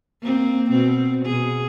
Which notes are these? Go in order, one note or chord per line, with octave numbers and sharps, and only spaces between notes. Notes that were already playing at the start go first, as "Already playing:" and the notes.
A#3 C4
B2 C4
B2 G#4